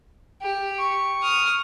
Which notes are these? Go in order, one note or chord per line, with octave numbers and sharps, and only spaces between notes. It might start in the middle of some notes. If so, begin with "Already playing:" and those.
G4
C#6
D#6 F6